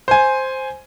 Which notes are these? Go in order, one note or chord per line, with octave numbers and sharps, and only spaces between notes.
C5 G#5